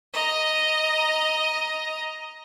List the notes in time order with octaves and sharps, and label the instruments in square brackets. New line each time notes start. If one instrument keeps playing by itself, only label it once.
[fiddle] D#5 A#5